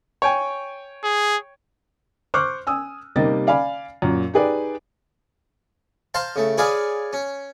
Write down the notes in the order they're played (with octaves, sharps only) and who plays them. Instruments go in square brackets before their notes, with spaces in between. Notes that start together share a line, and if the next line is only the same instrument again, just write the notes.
[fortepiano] C#5 G5 G#5
[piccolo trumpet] G#4
[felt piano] C5 C#6 D6 F6 F#6
G#5 D#6 E6
C3 G3 A#3 D#4 D#5 A6
D5 F5 G#5 B5
F#2 A#2
D#4 G4 G#4 B4 D5
[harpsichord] C5 F5 A5 A#5 C6
C#3 A3
G#4 B4 C#5 D5 F5 G#5
C#4